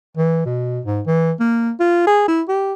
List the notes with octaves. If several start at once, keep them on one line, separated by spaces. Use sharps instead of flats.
E3
B2
G#2
E3
A#3
F4
G#4
E4
G4